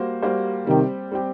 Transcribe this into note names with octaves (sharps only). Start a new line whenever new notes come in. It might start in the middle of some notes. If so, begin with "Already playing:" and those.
Already playing: G3 A#3 F#4 C5
G3 A#3 F#4 C5
C3 D#3 G3 C4 G4
G3 C4 G4